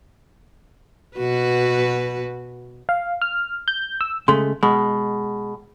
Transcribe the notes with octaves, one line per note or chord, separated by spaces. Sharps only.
B2 F#4 B4
F5
F6
G6
E6
C#3 G#3 A3 C6
B2 G#3